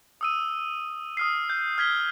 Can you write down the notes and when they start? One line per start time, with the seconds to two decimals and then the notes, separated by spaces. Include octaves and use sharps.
0.21 D#6 E6 D#7
1.17 D#6 F6 C7
1.50 G6
1.78 F6 G#6 B6 G7